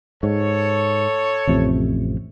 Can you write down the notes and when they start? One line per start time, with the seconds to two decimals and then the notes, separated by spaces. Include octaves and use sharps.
0.23 G#2 A4 C#5
1.47 A1 F2 C3